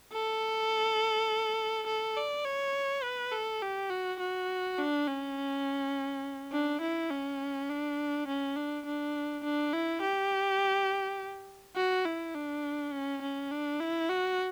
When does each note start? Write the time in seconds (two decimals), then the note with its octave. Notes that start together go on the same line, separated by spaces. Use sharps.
0.13 A4
1.87 A4
2.17 D5
2.45 C#5
3.03 B4
3.32 A4
3.62 G4
3.90 F#4
4.20 F#4
4.79 D4
5.08 C#4
6.52 D4
6.81 E4
7.11 C#4
7.69 D4
8.27 C#4
8.56 D4
8.86 D4
9.44 D4
9.73 E4
10.02 G4
11.76 F#4
12.06 E4
12.35 D4
12.92 C#4
13.22 C#4
13.51 D4
13.80 E4
14.09 F#4